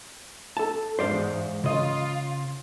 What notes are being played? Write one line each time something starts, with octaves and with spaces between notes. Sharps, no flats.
A4 A5
E2 G#2 C5 D5 F5
C#3 F4 D#5